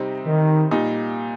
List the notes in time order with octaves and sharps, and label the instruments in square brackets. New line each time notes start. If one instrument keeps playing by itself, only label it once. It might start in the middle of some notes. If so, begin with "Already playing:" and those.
Already playing: [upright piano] C3 G3 C4 D#4
[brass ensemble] D#3
[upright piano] A#2 G3 D#4